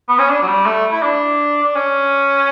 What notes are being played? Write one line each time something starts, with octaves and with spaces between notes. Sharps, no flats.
B3
C#4
D4
F#3
G3
A3
E4
D4
D4
C#4